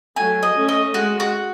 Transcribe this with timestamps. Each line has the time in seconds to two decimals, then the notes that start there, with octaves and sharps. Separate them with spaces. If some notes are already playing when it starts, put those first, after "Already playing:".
0.16 F#3 A3 G#5
0.43 D#5
0.55 A3 C#4
0.69 D#5
0.94 G#3 F#4
1.20 F#4